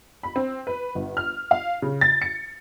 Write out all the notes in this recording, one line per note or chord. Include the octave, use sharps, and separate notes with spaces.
B5
C4
B4
G1
F6
F5
C#3
A6
C#7